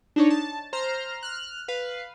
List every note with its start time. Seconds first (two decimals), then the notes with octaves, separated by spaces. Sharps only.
0.16 D4 D#4 C#5
0.30 A5
0.73 C5 A#5 F6
1.23 F6 F#6
1.68 B4 F5